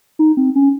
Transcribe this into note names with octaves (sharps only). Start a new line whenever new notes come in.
D#4
C4
C#4